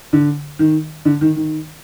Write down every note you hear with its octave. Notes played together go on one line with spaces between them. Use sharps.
D3
D#3
D3
D#3
D#3